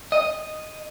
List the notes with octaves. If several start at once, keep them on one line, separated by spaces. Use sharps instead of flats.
D#5